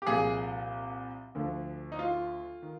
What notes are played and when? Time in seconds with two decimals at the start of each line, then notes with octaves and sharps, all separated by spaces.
0.02 G4
0.07 C2 A#2 F3 G#4
1.35 D2 D3 F3
1.92 D#4
1.99 F4
2.62 D#3